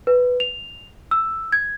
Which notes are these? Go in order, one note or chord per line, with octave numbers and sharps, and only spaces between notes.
B4
F7
E6
G#6